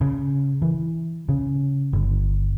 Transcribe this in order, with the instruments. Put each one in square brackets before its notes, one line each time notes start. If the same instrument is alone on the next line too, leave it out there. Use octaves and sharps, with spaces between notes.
[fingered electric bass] C#3
E3
C#3
G1